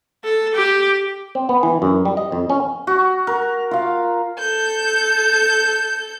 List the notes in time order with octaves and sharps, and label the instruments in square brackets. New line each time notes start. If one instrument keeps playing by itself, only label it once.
[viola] A4
G4
[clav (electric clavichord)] C4
B3
E3
F#2
G3
D#5
F2
C#4
[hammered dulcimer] F#4
A#4
F4 F5
[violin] A4 G6